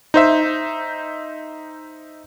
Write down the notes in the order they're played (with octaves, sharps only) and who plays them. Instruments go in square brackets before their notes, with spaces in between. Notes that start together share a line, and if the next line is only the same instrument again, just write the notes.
[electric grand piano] D#4 C5 E5